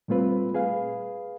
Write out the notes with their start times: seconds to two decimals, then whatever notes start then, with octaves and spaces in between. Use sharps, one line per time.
0.08 A#2 G3 A3 C4 F4 B4
0.55 G#4 B4 F5